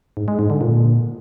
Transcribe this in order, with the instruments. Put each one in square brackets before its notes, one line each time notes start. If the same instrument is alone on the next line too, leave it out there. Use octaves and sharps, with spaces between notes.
[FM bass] G#2
G#3
G#2
D3
A#2